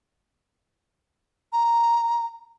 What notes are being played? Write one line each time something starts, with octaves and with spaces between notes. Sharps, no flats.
A#5